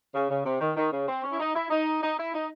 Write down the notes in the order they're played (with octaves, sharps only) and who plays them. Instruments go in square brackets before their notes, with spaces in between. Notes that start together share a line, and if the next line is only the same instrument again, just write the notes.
[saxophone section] C#3
C#3
C3
D#3
D#3
C#3
C4
C#4
E4
D#4
E4
D#4
D#4
E4
D#4